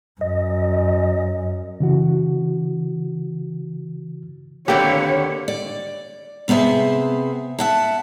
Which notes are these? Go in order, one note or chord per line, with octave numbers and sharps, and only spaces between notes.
F#2 D#5
C#3 E3 F#4
D#2 B2 D3 A#3 C4 G4 C#5 D5
D5
C3 B3 G#4 C5 E5
E5 F#5 A5